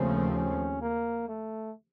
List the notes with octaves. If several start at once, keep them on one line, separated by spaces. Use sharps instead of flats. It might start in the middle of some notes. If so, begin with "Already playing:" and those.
Already playing: D#2 C#3 F3 A3 C4 C#4
C#4
A#3
A3